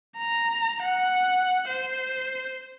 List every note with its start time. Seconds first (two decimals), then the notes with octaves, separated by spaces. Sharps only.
0.18 A#5
0.82 F#5
1.68 C5